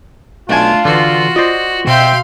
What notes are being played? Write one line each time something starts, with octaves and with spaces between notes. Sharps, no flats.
B1 A3 D4 F4 G#5
D3 E3 F#4
F4 C5 D5 D#5
B2 C4 E5 F5 G5 C6